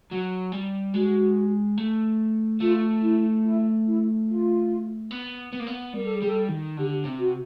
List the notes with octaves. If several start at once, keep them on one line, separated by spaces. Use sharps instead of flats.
F#3
G3
G#3 F#4
A3
A3 F4
E4
E4
E4
F4
B3
B3
A#3
B3
G3 A#4
A4
G#4
G3 A4
D#3
D3 G4
C3
F#4